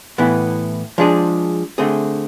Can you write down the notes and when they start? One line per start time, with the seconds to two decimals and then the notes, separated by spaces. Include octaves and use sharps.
0.18 A2 E3 B3 E4
0.98 F3 G#3 D4 G#4
1.78 D3 A3 C4 G#4